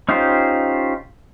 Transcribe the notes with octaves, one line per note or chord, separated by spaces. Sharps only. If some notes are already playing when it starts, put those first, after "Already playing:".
C#4 D#4 F4 G4 C5